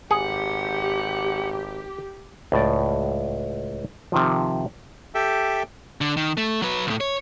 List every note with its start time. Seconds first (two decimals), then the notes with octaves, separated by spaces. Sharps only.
0.11 G#1 G4 G#4 F#5
2.52 C#2 A2 D5
4.12 C3 D#3 F3
5.15 G4 A4 E5 G5
6.01 D3
6.17 D#3
6.37 A3
6.62 F#3 B4
6.87 C2 A2
7.01 C#5